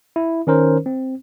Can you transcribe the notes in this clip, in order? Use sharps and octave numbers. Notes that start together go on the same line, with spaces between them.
E4
D#3 C#4 A#4 C5
C4